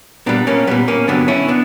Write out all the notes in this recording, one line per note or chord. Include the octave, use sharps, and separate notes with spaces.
A#2 G3 B3 D4
A#3 C#4
A#2 G3 B3
A#3 C#4
G2 D3 F#3 B3 D4
C#4 E4
B3 D4